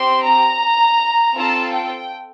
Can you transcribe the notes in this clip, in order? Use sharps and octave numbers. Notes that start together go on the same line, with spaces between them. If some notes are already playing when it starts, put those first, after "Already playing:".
Already playing: C4 G4 C6
A#5
C4 F4 A4 A5
G5